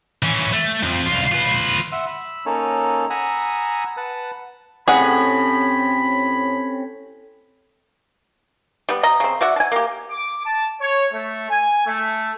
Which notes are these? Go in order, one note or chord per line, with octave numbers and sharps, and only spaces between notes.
E3 C#4
A3
F2 F3
C2 F4
F4 B4
E5 F#5 C6 E6
B5 E6
A#3 C#4 D#4 A4 C#5
F#5 G#5 A#5 B5 D#6 E6
B4 F#5 A5
A2 C4 C#4 G4 G#4 F#5 B5
G3 B3
D#5 A#5
C#3 C4
F#4 D5 E5 F#5
G#5 A5
A#3 G4
D6
A5
C#5
A3
G#5
A3